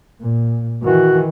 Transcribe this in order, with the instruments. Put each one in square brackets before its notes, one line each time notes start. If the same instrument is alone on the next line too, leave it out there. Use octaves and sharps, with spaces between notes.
[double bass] A#2
[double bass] D#3 E3 [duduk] F#4